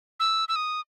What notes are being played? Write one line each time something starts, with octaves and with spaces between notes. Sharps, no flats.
E6
E6
D#6